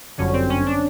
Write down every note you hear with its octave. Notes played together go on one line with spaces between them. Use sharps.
G1 F#2 D3 C#4
C4
C#4
D4